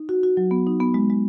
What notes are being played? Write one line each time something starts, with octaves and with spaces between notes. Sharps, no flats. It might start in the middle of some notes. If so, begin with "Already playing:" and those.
Already playing: D#4
F#4
F#4
F#3
B3
D#4
B3
G#3
G#3